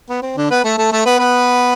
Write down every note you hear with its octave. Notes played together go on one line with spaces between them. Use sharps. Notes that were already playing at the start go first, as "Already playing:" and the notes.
B3
C4
D3 D4
B3 B4
A3 A4
A3 A4
A3 A4
B3 B4
B3 B4